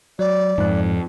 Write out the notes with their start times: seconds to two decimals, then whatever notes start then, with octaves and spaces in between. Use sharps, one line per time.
0.19 F#3 D5
0.58 F2 G#2 F#6